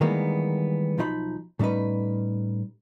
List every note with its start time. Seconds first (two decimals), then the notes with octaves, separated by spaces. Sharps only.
0.01 D#3 E3 G3 G#3 A#3 B3
0.98 B1 F3 D#4 C#5 B5
1.59 A2 G3 C#4 D#4 B4